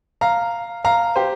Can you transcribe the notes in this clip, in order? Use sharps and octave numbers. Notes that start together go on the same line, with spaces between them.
F5 A#5
F5 A#5
G4 C5